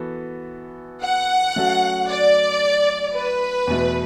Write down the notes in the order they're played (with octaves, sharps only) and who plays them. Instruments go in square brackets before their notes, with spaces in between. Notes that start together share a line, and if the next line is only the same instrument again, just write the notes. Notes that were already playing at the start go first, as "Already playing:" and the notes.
Already playing: [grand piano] E3 B3 F#4 A4
[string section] F#5
[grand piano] F#3 A3 C#4 F#4 A4
[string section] D5
B4
[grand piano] E2 B2 A3